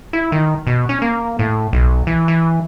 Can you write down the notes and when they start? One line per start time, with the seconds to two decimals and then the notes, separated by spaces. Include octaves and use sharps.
0.13 E4
0.32 D#3
0.67 B2
0.89 C#4
1.02 A#3
1.39 A2
1.73 B1
2.07 E3
2.28 E3